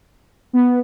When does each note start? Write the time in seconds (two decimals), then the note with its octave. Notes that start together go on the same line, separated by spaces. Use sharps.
0.53 B3